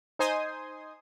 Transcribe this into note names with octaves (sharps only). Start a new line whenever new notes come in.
D#4 C5 G#5 C6 D#6